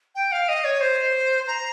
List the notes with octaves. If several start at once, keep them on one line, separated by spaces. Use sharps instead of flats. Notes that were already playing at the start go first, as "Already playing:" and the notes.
G5
F5
D#5
C#5
C5
A#5